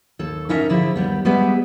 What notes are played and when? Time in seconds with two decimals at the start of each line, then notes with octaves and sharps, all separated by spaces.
0.19 D#2 A4
0.49 C#4 D#4 E4 A4 A#4 E5
0.70 D3 F3 E4 G#4
0.96 D#2 G3 B3
1.25 G3 G#3 B3 G#4 B4 E5